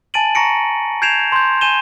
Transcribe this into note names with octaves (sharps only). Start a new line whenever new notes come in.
G#5 A5 A6 D7 D#7 F#7
A#5 C#6 A#6 C#7 D7
G6 G#6 C7 D7 E7 F7
C6 G6
G#5 G6 D#7 E7 G7